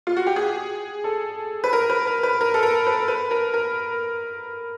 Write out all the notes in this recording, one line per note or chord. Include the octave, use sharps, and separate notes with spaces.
F4
F#4
G4
G#4
A4
B4
A#4
B4
A#4
B4
A#4
A4
A#4
B4
B4
A#4
A#4